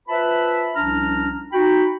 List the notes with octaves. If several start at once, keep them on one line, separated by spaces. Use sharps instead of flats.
F4 B4 C5 E5 A5 B5
C2 F3 C#4 D4 A#5 F6
D#4 F#4 G5 B5